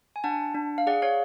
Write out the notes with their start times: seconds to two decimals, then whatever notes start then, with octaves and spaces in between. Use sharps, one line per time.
0.16 G#5
0.24 D4 F#5 A5
0.55 D4
0.78 F5
0.87 G#4 D5 F#5
1.02 C#5 F5